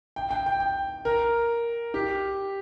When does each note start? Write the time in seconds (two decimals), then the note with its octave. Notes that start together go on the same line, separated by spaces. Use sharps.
0.16 G5
0.31 G5
0.46 G5
0.60 G5
1.05 A#4
1.94 G4